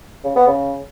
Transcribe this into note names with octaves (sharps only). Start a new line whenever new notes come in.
C#3
B3
C#3